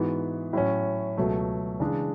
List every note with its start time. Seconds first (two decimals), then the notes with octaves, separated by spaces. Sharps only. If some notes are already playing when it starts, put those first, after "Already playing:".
Already playing: G#2 E3 B3 F#4
0.53 A2 F#3 C#4
1.18 C#2 B2 F#3 A3
1.80 C#3 E3 G#3 D4